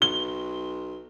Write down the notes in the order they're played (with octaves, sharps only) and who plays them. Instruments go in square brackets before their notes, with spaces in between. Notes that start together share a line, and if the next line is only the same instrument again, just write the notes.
[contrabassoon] B1 [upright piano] G7